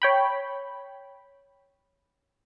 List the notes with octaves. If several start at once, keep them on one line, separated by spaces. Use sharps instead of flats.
C#5 G5 B5